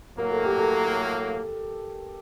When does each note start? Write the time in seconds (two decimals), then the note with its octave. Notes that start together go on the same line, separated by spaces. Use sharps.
0.17 A2 F#3 A#3 A#4
0.31 A4
0.43 G4
0.57 A4